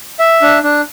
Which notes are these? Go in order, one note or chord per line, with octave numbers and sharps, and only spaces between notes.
E5
D4
D4